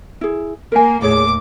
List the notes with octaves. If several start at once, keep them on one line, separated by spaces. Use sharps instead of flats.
E4 G#4
A#3 A#4 G#5
D#2 A2 G#4 C#5 D5 D6